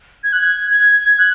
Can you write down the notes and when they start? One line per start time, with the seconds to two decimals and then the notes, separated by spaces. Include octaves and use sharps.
0.24 G#6
0.33 F#6
0.41 G#6
0.71 G#6
1.18 F#6